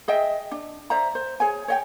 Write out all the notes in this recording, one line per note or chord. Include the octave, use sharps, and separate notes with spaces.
G#4 D#5 E5 G5
D4
C5 D5 E5 A#5
C5
G#4 C#5 G#5
C#5 D#5 G5